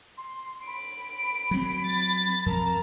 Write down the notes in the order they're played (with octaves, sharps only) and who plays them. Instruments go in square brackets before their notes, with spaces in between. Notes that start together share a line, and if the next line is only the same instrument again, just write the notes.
[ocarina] C6
[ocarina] B5 [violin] D7
[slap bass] F#3 C4
[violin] A6
[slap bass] F2 [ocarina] A#4 [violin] A5 A#5